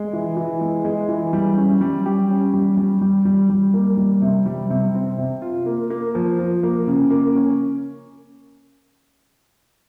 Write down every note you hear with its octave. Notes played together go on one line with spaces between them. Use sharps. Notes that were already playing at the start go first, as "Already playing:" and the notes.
Already playing: G#3
E3
E3
G#3
G#3
E3
G3
C#4
G3
G4
C#4
G3
G3
G3
G3
G3
A#3
G3
C3
G3
C3
C4
C3
F4
A#3
A#3
F3
F3
A#3
C#3
A#3
C#4